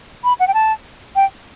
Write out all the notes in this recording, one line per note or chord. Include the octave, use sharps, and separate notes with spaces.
B5
F#5
G5
A5
G5